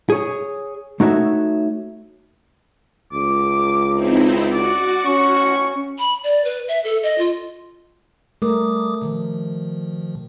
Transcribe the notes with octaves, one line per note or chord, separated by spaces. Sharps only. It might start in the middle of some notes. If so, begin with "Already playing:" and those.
G#4 C#5
A3 D#4 F#4 C#5 E5
C#2 D6
C4 D#4 E4
F#4 D5 C#7
C#4 C#6
B5
D5
B4
E5
A4
D#5
F4
G3 A3 A#4 D6 D#6
B2 D#3 F3